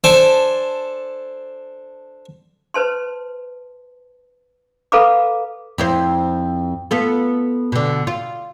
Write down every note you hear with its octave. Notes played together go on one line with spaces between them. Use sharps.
D4 A4 C5 G#5 D6
B4 C5 A5 C6
A4 B4 F5 A#5 B5 D6
F2 E4 C5
B3 F4 A4
B2 D3
F4